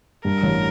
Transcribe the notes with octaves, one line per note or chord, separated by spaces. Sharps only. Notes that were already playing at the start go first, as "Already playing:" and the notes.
G2 A#4
A1